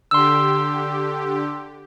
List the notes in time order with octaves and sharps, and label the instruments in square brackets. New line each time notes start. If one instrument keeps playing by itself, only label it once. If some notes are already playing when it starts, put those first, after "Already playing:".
[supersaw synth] D3 G4 [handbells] C6 E6